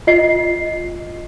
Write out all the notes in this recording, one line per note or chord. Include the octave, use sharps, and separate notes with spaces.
F4 D#5 C7